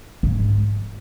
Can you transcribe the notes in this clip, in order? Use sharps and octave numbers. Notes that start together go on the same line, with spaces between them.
G#2